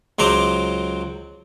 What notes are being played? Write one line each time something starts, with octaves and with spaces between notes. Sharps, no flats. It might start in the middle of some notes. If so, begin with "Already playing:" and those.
C#2 F#3 C5 A#5 D6